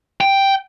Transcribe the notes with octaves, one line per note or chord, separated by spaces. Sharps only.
G5